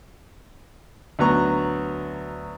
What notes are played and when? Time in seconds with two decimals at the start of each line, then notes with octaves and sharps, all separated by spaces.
1.19 D2 F#3 B3 A#5 C#6